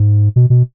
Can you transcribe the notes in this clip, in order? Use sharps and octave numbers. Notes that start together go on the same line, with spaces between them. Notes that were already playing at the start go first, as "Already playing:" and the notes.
Already playing: G#2
B2
B2